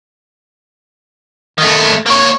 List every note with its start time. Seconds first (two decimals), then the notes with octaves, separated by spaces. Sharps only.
1.58 D#3 A3
2.06 A#3 C#5